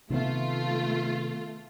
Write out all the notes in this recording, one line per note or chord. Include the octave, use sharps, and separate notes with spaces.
C3 D#3 A3 B3 F4